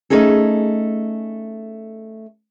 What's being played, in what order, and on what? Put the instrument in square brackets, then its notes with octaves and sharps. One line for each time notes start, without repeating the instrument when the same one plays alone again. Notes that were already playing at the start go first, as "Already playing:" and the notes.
[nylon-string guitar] A3 C#4 D#4 G#4 A4